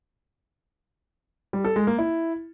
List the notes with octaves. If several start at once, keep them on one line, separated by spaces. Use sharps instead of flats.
G3
A4
G#3
A#3
E4